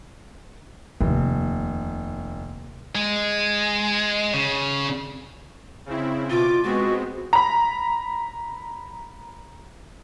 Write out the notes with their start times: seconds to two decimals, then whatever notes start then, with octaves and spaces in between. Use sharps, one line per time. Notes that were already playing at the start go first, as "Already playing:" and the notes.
1.01 F1 D#2 C3
2.95 G#3
4.34 C#3
5.86 C#3 C4 E4
6.30 B2 F4 D6
6.64 G#3 B3 C4 F#4
7.33 A#5 B5